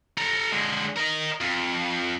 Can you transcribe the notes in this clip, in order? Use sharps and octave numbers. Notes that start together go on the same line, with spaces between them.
A4 A#5
D3 G#3
A#4 D#5
F2